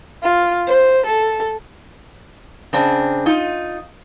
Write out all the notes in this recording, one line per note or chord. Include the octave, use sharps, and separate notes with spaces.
F4
C5
A4
C#3 C4 D4
D#4 F4